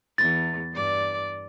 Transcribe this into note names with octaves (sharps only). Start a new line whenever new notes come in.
E2 A6
G2 D5